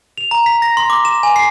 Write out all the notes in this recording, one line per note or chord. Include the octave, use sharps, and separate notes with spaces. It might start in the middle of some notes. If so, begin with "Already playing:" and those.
F7
A#5
B6
A#6
C6
D6
E7
G#5
C7